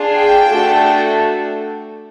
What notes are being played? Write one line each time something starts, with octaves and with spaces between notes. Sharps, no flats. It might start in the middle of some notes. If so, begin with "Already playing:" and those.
Already playing: D4 F4 G#4
G5
A3 D4 F#4 A4